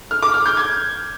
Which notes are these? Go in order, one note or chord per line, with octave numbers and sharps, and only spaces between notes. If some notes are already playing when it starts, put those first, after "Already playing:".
F6
D6
F6
G6
G#6